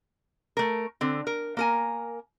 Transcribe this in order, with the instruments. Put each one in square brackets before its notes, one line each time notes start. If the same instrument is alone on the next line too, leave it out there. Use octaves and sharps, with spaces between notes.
[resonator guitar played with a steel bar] A3 A#4
D3 C4
A#4
A#3 A#4 G#5